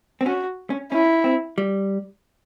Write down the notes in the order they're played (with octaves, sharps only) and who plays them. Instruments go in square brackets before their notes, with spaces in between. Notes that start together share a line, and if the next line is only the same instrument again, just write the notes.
[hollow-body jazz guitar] C4
[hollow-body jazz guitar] C#4 [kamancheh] F#4
[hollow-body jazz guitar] C#4
[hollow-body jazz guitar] C#4 [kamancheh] E4
[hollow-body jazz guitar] C4
G3